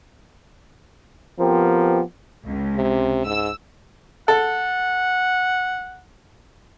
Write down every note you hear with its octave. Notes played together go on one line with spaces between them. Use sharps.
F3 B3 C4 G4 A#4
C#2
C3
G#2 E6
A4 F#5